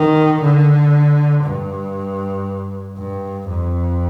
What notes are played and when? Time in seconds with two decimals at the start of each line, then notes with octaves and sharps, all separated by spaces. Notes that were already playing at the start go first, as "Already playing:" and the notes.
Already playing: D#3
0.42 D3
1.44 G2
2.98 G2
3.48 F2